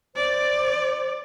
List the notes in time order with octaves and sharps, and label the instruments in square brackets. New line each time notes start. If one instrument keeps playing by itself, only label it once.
[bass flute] C5 [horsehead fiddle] D5